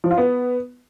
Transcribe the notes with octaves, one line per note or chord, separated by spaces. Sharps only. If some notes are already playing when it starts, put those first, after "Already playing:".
F3
F4
B3